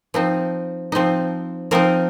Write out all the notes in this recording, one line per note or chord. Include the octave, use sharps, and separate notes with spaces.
F3 C4 D#4
F3 C4 D#4
F3 C4 D#4 A#4